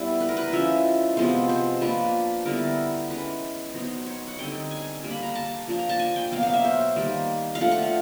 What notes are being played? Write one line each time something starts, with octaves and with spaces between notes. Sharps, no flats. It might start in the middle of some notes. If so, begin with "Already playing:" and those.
Already playing: G3 B3 D4 E4
B4
A#4
B4
F3 G#3 C#4 E4 E5
C3 F3 G#3 B3 C5
C5
F3 A#3 D4 B4
D3 G3 B3 E4 A#4
E3 G#3 C#4 B4
F#3 B3 D#4 C5
C#5
F#5
D3 G3 C4 D#4 G5
G#5
G3 A#3 D4
B5
A#5
A5
F3 A#3 D4
A#5
A5
G#5
G5
B2 F#3 A#3 F5
F5
E5
C5
D#3 G3 A#3
F5
F3 A3 D4 F#5
F#5
F5